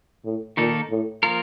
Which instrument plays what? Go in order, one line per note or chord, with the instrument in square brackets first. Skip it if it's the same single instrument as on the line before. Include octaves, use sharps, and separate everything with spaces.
[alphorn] A2
[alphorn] A#2 [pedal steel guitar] D#3 A#3 D#4 A4
[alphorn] A2
[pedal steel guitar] F3 A#3 F4 A#4